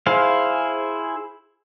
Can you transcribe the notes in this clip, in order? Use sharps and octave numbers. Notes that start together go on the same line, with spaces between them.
E4 G#4 C5 F5